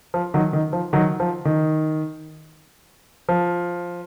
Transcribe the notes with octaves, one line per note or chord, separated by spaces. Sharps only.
F3
D#3 F#3
D#3
F3
D#3 F#3
F3
D#3
F3